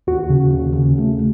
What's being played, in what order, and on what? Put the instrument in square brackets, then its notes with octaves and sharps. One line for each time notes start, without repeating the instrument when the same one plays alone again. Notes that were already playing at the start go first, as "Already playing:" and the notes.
[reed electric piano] D#2 F#4
C#3
D#2
C#3
A3